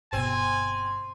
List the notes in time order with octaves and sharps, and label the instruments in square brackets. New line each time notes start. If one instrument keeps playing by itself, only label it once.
[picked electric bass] G1 B2 [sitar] C4 [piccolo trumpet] G#5